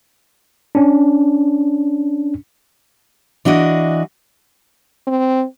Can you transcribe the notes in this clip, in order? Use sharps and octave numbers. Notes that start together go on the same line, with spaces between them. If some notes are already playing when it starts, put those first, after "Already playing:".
C#4 D4
E3 D4 F#4 D#5
C4